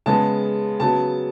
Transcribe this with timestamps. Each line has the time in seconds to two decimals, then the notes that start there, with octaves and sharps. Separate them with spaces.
0.06 C#3 G#3 B3 A5
0.80 C#3 F#3 B3 A5